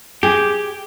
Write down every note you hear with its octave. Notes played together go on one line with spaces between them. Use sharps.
G4 G#4